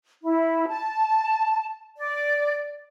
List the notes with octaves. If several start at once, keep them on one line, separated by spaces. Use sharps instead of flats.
E4
A5
D5